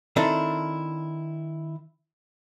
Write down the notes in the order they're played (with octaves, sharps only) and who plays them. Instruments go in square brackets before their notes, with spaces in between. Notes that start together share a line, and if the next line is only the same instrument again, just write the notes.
[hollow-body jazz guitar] D#3 C4 D4 E4 A4